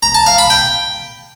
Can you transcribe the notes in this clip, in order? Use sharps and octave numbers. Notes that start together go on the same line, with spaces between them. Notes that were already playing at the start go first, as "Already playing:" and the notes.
A#5
A5
F5
B5
G5